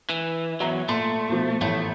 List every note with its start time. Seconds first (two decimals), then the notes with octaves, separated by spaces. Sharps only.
0.09 E3
0.60 E2 F#3 E5 A#5
0.88 A#2 A3 C6
1.29 B2 F3
1.61 A1 A3